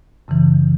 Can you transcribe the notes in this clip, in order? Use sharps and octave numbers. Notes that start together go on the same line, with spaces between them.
F#2 C#3 E3